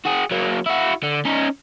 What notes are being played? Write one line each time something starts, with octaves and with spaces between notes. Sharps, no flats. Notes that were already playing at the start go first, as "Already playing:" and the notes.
F#4 G#4
F#3 A#3
E4 F#4
D3
C#4 D#4